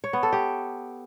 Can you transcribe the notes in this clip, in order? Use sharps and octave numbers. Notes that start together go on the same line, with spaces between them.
C#5
B3
A4
G4